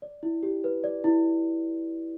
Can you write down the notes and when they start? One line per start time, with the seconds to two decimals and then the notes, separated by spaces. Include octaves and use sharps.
0.02 D5
0.23 E4
0.43 G4
0.64 B4
0.84 D5
1.04 E4